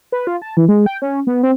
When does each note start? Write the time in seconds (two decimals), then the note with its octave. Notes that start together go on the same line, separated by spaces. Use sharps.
0.12 B4
0.27 F4
0.42 A5
0.57 E3
0.68 G#3
0.86 G5
1.02 C#4
1.27 B3
1.43 C4